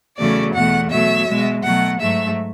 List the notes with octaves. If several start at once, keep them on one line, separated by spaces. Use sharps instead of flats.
E2 C#3 F#3 A3 D5
E2 B2 A3 F#5
B2 F#3 A3 E5
B2 G#3
B2 F#3 A3 F#5
G#2 F#3 A3 E5